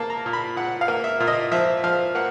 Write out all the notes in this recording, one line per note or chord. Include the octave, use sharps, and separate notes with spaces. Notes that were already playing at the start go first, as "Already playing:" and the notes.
Already playing: A#3 A5
A#5
A#2
B5
A#2 F#5
F5
A#3
E5
A#2
D#5
F3 E5
F3 F5
A#3 F#5